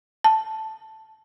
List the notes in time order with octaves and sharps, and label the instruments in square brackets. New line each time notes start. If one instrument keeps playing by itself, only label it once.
[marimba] A5